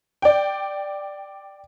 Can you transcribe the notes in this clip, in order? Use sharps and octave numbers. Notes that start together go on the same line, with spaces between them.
D5 G5